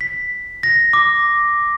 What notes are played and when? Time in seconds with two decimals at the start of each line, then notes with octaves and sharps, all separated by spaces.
0.01 B6
0.63 A#6
0.93 D6